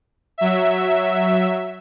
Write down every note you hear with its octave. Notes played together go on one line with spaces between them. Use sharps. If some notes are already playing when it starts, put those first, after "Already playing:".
F#3 E5